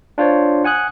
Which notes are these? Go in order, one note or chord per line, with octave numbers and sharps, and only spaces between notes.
D4 F4 C5 C#5
F#5 G#5 D#6 F#6